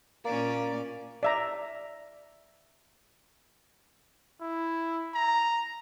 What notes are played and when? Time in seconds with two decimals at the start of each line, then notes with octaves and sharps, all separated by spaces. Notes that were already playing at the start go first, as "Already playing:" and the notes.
0.25 A#2 A#3 C#4 D5
1.23 D5 E5 A#5
4.41 E4
5.14 A#5